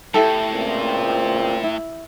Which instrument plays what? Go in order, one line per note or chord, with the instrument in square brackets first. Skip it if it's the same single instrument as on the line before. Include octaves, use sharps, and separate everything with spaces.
[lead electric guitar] A2 [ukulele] E4 G4 A4
[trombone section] C#2 A#2 C4
[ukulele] E4